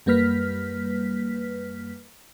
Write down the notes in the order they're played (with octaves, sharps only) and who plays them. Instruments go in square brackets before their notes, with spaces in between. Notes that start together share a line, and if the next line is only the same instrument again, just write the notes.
[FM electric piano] F#2 G3 A#3 B4 F6 B6